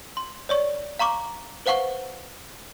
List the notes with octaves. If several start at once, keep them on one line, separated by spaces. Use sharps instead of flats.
C6
C#5 D5 C#6
F5 A#5 C#6 D6
B4 C5 F5 F#5 C#6 G7